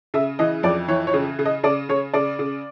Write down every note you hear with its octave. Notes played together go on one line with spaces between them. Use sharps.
C#3 E5
E3 D#5
F2 D5
E3 C#5
C#5
C#3
C#3
D#5
C#3 D5
C#3 C#5
C#3 D5
C#3